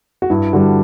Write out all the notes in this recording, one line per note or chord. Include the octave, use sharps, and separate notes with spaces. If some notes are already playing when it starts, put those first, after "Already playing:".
F#4
G2 E4
D3 G3 F#4